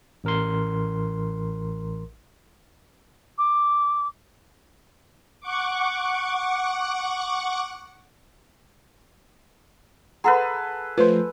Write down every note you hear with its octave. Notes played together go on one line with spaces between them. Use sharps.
A1 A#4 C6
D6
F#5 C#6 D6
G#4 A4 B4 F#5 A#5 C6
F3 A3 B4 C5